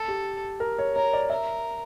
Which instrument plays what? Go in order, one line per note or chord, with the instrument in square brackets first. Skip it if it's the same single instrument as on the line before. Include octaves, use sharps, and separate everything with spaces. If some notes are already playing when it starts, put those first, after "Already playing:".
Already playing: [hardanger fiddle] A4
[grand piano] G4
A#4
C#5
[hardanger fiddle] A#4 [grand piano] C#5
[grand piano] D5
[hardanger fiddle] A#4 [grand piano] E5